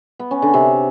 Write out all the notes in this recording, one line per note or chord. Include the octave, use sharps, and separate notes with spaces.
B3
C#4
D3
C3